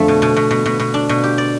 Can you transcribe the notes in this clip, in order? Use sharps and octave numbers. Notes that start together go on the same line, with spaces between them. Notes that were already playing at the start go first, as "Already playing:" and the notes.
Already playing: F2 D3 A3
B2
B2
B2
B2
B2
B2
D4
B2
G4
D5